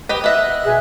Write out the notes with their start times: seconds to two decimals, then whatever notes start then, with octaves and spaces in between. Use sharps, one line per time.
0.09 G4 B4 D#5
0.24 B3 D#5 E5 F#6
0.65 B2 G#4 E5